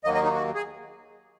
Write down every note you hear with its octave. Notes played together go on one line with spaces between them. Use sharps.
D#2 D#3 F#3 A#3 D#5
D#5
D#4
F#4
G#4